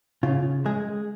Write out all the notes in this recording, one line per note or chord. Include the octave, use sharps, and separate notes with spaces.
C#3 F4
G#3 G#4